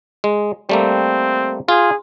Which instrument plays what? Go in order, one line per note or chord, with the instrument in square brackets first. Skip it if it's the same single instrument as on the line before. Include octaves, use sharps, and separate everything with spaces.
[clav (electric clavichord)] G#3
[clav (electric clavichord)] G3 A3 A#3 [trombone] C4
[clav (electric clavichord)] F4 [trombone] G#4